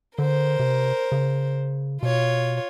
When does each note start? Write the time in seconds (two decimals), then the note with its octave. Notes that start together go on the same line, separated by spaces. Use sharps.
0.18 D3 A#4 C5
0.59 C3
1.12 C#3
2.03 B2 F4 C#5